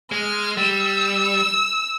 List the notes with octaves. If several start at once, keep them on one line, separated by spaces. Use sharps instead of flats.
G#3 F6
G3 E6